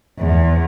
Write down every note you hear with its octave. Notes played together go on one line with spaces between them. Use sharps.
E2